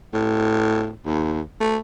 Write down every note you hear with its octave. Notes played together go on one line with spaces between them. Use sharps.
A2
D#2
A3